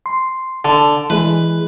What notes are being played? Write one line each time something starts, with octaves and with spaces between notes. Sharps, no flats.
C6
D3 A5
E3 G#3 G#4 B4